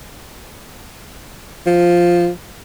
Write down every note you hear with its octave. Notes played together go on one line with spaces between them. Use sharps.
F3